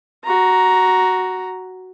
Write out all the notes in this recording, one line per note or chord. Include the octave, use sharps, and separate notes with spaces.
F#4 A#5